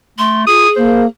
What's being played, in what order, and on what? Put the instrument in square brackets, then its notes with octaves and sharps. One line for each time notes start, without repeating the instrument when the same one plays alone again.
[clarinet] A3 [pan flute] C6
[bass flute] F4 [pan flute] G#4 [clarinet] D#6
[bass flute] A#3 [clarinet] C5